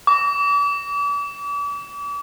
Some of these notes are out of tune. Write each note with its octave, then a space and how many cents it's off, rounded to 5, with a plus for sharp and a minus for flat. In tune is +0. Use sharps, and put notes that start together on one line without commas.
D6 -40